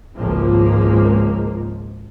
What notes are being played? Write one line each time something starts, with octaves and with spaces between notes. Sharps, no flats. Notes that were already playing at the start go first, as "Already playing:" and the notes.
G#1 C#2 F3 G#3 A#3